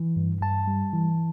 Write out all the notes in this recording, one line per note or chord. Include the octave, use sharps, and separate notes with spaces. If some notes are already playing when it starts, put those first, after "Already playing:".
Already playing: E3
G2
G2 A5
G3
E3